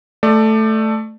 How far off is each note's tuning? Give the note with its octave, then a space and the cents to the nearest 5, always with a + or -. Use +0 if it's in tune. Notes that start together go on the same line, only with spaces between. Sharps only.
A3 +0 D5 +25